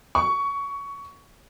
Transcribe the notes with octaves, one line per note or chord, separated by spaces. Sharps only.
C#6